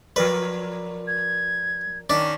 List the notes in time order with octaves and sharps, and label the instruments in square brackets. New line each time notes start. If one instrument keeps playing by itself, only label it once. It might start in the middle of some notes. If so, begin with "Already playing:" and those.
[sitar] F3 A#4 D5 [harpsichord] B4
[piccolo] G#6
[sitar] D#3 C#4 [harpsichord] D4 [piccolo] B6